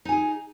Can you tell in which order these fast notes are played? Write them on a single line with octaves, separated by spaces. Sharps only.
D#4 G#5 G#4